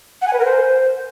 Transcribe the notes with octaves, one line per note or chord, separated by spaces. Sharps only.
F#5
G#5
B4
A#4
C5